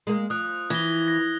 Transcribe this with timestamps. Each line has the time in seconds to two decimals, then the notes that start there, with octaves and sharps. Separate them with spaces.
0.07 G#3 A#3
0.30 F3 D#6 F#6
0.70 E3 G#6 A#6 G7
1.08 A#6